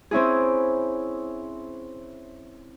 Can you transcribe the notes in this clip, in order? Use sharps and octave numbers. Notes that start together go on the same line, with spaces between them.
C4 C#4 E4 G#4